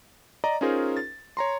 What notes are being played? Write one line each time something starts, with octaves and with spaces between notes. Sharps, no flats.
D5 D#5 A#5
C#4 D#4 F4 G#4 A#4 C5
A6
C#5 A#5 C6